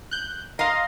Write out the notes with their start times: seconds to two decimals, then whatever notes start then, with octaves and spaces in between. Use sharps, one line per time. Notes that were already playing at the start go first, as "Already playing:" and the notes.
0.11 F#6 G6
0.59 D#5 F5 A#5 C6